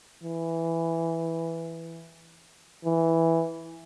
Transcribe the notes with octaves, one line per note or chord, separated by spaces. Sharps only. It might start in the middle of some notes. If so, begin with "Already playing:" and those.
E3
E3